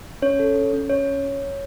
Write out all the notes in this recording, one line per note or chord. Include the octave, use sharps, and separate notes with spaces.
C#4 C#5
A4
C#4
C#4
C#4 C#5